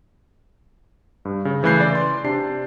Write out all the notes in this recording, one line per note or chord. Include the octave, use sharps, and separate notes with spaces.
G2
C#3
C#3 E3 A3 F#6 G6 C7
D5
C6
C3 D4 C7